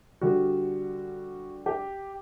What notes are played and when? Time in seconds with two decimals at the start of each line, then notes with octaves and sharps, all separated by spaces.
0.21 D3 G3 F#4
1.66 G4